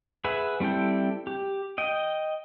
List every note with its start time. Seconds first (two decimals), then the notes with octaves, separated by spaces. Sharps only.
0.24 G#4 B4 E5 F#5
0.60 G3 C4 E4 A4 G5
1.27 G4
1.78 D#5 G5